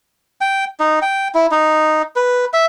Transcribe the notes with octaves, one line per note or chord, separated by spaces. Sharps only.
G5
D#4
G5
E4
D#4
B4
E5